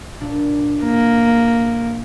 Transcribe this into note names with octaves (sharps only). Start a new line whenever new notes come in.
A#2 D4
A#3